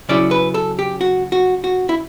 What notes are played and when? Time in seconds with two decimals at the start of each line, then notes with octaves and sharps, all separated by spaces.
0.09 C#3 F#3 C#4 E4 D5
0.31 B4
0.54 A4
0.79 G4
1.01 F#4
1.32 F#4
1.64 F#4
1.89 E4